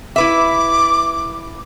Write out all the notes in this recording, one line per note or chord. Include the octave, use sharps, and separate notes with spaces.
E4 B4 E5 D6